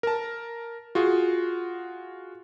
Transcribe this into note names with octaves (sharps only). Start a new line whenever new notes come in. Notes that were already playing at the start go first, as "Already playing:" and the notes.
A#4 A5
F4 F#4 G#4